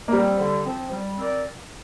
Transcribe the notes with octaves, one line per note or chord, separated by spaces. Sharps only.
A#3
F3 G3 C4
D3
F3 C4
G3
C4 A#4 D5